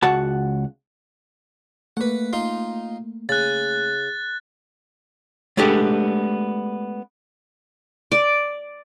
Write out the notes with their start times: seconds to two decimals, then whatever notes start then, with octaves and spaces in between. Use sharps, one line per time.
0.03 C#2 F#4 F#5 A5
1.97 A3 A#3 B4 F#5
2.33 D#4 F4 C6
3.29 C#3 F#6 A6
5.57 G#3 A3 B3 D4 G4
8.12 D5